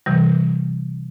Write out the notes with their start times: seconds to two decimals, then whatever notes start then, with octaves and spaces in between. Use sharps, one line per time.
0.06 C3 E3 G3